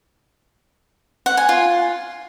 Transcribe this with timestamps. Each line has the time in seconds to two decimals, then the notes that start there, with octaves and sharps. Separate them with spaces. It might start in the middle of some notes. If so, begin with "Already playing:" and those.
1.26 F#5
1.37 G#5
1.49 F4